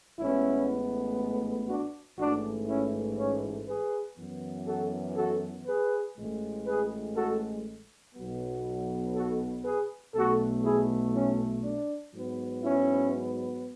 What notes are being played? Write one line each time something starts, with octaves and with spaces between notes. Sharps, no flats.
A1 A2 G#3 B3 C#4 E4
D4 F#4
A1 G#2 E3 A3 D4 F#4
C#4 E4
C#4
G#4 B4
F#2 E3 B3
F#4 A4
F#4 A4
G#4 B4
A1 A2 G#3
G#4 B4
F#4 A4
B1 B2 F#3 B3
F#4 A4
G#4 B4
B1 B2 A3 F#4 A4
E4 G#4
C#4 E4
D4
G#2 F#3 B3
C#4 E4